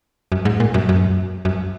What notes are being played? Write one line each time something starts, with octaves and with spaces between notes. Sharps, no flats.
F#2
G#2
A#2
F#2
F#2
F#2